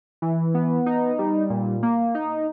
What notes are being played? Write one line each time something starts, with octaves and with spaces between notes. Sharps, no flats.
E3
B3
D#4
G3
A#2
A#3
D#4